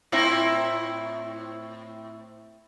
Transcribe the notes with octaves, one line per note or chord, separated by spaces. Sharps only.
A2 C4 E4